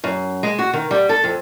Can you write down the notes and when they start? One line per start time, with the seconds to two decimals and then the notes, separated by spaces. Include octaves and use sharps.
0.04 F#2
0.43 G#3
0.59 F#4
0.73 D#3
0.91 G3
1.09 A4
1.24 F2